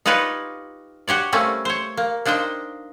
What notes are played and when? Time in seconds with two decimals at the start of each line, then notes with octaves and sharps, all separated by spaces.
0.06 D#4 F4 G4 B4 C#5 D5
1.08 F#4 G4 C#5 D5
1.32 G3 A3 A#3 C4 C#4
1.65 C5 C#5
1.97 A#3
2.25 A#3 D4 D#4 C5 G5